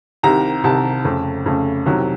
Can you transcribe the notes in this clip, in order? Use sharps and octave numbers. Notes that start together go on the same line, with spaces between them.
C2 C3 D#3 A#5
C2 C3 D#3 A5
F2 C#3 A3
F2 C#3 A3
C2 C3 D#3 F#3